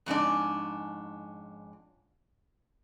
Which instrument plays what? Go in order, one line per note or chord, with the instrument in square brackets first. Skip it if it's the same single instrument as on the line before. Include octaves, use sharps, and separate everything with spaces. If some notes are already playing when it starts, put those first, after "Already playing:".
[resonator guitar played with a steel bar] F2 G#2 C#4 D4